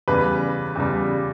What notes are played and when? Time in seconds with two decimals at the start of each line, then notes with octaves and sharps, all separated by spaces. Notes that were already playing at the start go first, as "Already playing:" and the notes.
0.08 E2 C#3 G3 B4
0.76 E2 C#3 G3